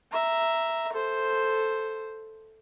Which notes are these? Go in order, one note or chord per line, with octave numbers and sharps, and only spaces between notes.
E5 A#5
A4 C5